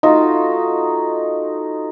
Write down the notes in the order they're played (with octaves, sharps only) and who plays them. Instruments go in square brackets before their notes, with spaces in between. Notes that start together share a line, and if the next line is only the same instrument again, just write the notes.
[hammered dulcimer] A3 F4 F#4 [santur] D#4